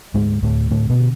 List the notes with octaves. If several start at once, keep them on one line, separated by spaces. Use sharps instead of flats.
D2 G#2 G#3
D2 A2 A3
A2 D3 A3
B2 B3
D3